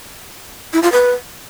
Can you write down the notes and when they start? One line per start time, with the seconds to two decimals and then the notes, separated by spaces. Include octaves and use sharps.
0.73 E4
0.83 F4
0.92 B4